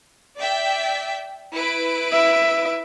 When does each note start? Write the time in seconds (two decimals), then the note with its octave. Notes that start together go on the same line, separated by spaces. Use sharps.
0.36 D5 E5 G5
1.54 E4 B4 D7
2.12 E5